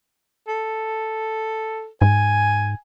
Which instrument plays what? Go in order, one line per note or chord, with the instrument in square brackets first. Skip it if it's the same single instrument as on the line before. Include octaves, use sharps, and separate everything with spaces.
[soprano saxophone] A4
[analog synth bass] G#2 [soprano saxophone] G#5